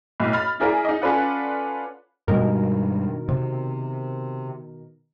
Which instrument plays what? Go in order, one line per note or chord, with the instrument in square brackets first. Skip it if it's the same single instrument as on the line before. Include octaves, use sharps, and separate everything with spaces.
[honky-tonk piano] B1 A2
B5 F6 A6
E4 G#4 A#4 D5
D#4 D#5
C#4 F4 A4 B4 D5 F#5
[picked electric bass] G2 G3 G#3 [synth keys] B2 D#3 A#4
[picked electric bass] C3